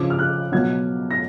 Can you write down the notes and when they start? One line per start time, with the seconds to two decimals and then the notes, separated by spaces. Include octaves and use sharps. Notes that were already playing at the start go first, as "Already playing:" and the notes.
Already playing: C#3 F3 D6
0.10 F6
0.19 F#6
0.52 B2 F#3 G#6
1.11 A#6